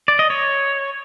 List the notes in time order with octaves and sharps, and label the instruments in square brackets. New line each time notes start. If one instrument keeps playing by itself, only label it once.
[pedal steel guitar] D5
D#5
C#5